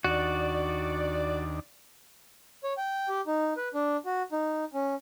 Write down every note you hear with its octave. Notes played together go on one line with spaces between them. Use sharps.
D#2 D4 F#4 D5
C#5
G5
G4
D#4
B4
D4
F#4
D#4
C#4